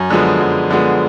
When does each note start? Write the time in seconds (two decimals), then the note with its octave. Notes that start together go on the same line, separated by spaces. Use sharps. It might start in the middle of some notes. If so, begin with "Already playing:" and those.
Already playing: F#2 G#5
0.10 D3 F3 G#3 B3
0.41 F#2
0.70 D3 F3 G#3 B3